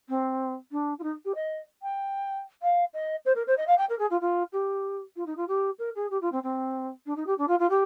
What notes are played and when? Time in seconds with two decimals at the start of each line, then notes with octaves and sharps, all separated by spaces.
0.09 C4
0.72 D4
0.99 F4
1.03 D#4
1.25 G4
1.35 D#5
1.83 G5
2.62 F5
2.94 D#5
3.25 C5
3.36 A#4
3.47 C5
3.57 D#5
3.67 F5
3.78 G5
3.90 A#4
3.99 G#4
4.11 F4
4.21 F4
4.53 G4
5.16 F4
5.26 D#4
5.37 F4
5.48 G4
5.79 A#4
5.96 G#4
6.11 G4
6.22 F4
6.32 C4
6.43 C4
7.06 D4
7.16 D#4
7.27 G4
7.38 D4
7.48 F4
7.59 F4
7.70 G4